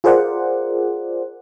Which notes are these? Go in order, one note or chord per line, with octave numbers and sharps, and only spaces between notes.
F4 G#4 A#4 C5 D5 F#5